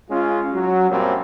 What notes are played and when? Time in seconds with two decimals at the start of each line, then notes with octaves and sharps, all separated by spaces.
0.10 G#3 C#4 F4
0.53 F#3
0.90 F#2 A#2 G3 C4